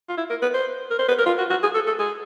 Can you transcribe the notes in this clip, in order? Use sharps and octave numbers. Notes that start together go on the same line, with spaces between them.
F4
E4
A#4
B4
C5
A#4
C5
B4
A#4
F4
F#4
F#4
G#4
A4
A4
G#4